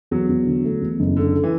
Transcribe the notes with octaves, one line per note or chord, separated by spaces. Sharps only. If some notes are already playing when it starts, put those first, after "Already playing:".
E2 F#3
E2
D3
A3
E2
F#1
D3 A4
A4
E3